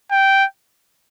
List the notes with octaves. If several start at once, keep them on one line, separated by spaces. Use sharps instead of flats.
G5